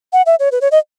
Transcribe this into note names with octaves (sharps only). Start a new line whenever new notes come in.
F#5
E5
C#5
B4
C#5
D#5